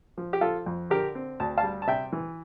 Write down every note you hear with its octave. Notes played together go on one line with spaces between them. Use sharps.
F3
G4
F3 F4 A4
F2
D3 G4 A#4
C4
D2 A5
F5 A5
G3
A5
C3 E5 G5
E3